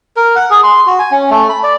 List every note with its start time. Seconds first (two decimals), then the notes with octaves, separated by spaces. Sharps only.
0.17 A#4
0.36 F#5
0.50 G#4
0.63 C6
0.87 F#4
0.99 G#5
1.11 C#4
1.30 A3
1.50 B5
1.63 D5